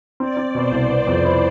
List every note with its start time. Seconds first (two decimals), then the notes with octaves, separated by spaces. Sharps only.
0.20 C4 D5
0.37 C4
0.55 B2 C5
0.72 C2
0.90 B3
1.07 F2
1.25 E4